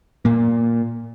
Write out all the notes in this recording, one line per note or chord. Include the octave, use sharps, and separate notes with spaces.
A#2 A#3